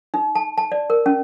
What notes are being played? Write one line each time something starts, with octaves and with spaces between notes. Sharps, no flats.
D#4
A5
A5
D5
A#4
C#4